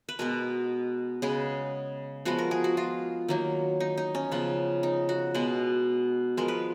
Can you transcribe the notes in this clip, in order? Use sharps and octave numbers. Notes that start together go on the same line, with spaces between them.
B4
B2 G#3 B3 A#4
C#3 G#3 B3 G#4
F3 G#3 B3 F#4
A#4
G#4
F#4
F4
D#3 F#3 A#3
D#4
D#4
C#4
C#3 F3 B3
D#4
F#4
B2 G#3 B3
F3 G#3 B3 A#4
B4